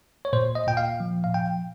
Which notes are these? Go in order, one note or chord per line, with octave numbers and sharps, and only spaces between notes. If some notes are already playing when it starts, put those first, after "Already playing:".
C#5
A#2 C5
D#5
A#2 G5
F5
F3
F5
A#2 G5